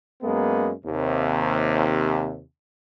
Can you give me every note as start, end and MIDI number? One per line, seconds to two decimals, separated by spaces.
0.22 0.71 42
0.22 0.71 56
0.22 0.71 58
0.22 0.71 59
0.85 2.41 39
0.85 2.41 48